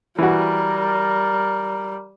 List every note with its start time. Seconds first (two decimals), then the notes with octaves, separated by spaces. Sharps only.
0.18 E3 G3 F#4 A#4